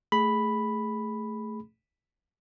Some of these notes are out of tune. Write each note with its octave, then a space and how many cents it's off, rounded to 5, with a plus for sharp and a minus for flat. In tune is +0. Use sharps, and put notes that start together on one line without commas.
A3 +0 G#4 +0 B5 +0